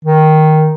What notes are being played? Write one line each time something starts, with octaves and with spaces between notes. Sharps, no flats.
D#3